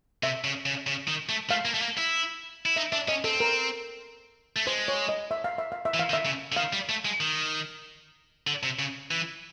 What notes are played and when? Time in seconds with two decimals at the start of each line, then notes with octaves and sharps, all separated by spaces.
0.23 C3 E5
0.44 C#3
0.66 C#3
0.87 C#3
1.08 D#3
1.29 A3
1.50 A3 F5
1.65 A#3
1.74 A3
1.82 A#3
1.97 E4
2.66 E4
2.76 D#4 E5
2.92 D4 E5
3.08 C#4 D#5
3.24 C4 A4
3.40 A#4
4.56 A3
4.67 G#3 C5
4.88 C#5
5.09 D#5
5.31 E5
5.44 F5
5.58 E5
5.72 F5
5.85 E5
5.94 E3
5.99 F5
6.10 D#3
6.13 E5
6.25 C#3
6.52 D3
6.57 D#3 F5
6.73 G3
6.89 A3
7.05 G#3
7.20 D#3
8.47 D3
8.63 C3
8.79 C#3
9.11 E3